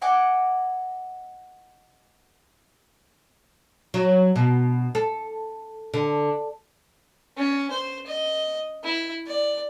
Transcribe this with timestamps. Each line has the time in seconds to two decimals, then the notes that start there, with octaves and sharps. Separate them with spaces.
0.02 D#5 F#5 G#5 D6
3.94 F#3
4.36 B2
4.95 A4
5.94 D3
7.37 C#4
7.71 C5
8.07 D#5
8.83 E4
9.27 D5